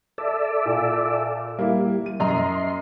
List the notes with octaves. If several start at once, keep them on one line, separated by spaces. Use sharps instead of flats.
A4 D5 E5
A#2
G3 A#3 E4
D#7
F#2 D#5 A#5 C6